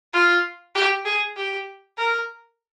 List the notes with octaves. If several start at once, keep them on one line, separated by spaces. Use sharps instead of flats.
F4
G4
G#4
G4
A#4